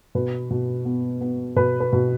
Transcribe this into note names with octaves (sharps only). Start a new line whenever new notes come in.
B2 B4
B2
B3
B3
B2 B4
B4
B2